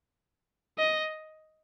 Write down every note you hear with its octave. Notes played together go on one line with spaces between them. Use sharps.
D#5